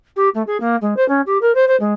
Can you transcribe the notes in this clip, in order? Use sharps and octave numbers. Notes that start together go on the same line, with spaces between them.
G4
A3
G#4
A#3
G#3
C5
C#4
G4
A#4
C5
C5
G#3